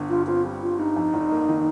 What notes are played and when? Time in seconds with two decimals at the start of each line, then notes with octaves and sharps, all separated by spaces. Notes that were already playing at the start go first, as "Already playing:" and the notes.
Already playing: G1 D3
0.09 G2 F4
0.27 C4 F4
0.44 G3
0.62 D3 F4
0.79 G2 D#4
0.96 F2
1.14 F1
1.32 A#3
1.49 D#3